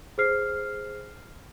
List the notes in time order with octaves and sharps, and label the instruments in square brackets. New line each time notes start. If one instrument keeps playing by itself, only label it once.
[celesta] G#4 C5 F6 C7